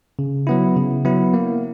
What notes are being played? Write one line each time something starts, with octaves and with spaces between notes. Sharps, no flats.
C#3
F#3 B3 E4
C#3
F#3 B3 E4
A#3